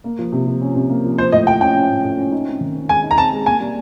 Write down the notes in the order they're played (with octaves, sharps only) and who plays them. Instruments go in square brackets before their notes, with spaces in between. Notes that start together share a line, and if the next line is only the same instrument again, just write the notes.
[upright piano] A#3
F3
C3
F3
C#4
C3
A#3
F3
[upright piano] F3 [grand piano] C5
[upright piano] A2 [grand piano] D#5
[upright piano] F3 [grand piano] G5
[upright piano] C#4 [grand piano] G5
[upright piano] C#4
A2
A2
C#4
D#4
C4
D#3
C4
[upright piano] G#3 [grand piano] G#5
[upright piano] D#4
[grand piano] A#5
[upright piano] C4 [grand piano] A5
[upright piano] G#3
[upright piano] A#3 [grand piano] G#5
[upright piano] G3